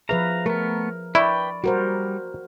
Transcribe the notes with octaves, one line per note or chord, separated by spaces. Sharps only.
F3 G#4 B4 E5 F5 A#5
A3 B3 A#4
E4 B4 D5 G5 B5 C#6
G3 F#4 A#4 C5